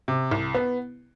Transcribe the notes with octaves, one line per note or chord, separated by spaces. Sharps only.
C3
C2
B3